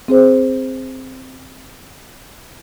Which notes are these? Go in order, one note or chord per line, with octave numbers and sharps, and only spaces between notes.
C4 G#4 C5